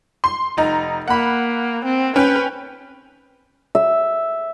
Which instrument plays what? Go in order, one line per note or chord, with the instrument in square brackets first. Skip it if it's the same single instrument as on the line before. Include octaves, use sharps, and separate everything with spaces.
[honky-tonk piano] C6
F1 D#4 A#5
[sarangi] A#3 [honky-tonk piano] F#5 B5
[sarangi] C4
[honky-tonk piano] C#4 G5 [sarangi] B4
[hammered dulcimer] E5